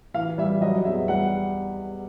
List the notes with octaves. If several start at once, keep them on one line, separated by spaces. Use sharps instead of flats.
E3 F5
G3 E5
F#3 D#5
E2 E5
G3 F#5